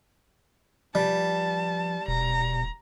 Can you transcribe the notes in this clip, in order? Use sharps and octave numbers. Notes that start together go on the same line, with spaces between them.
F3 G3 B4 G5 A5
D#1 B2 A#5